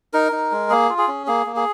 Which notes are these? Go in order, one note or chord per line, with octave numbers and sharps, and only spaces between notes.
D#4 A#4
D#4
G#3
A#3 G#4
F4
G#4
C#4
A#3 G#4
A#3
G#4